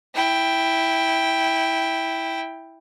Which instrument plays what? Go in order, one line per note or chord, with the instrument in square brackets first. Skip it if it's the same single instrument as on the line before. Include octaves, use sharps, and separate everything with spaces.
[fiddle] E4 G5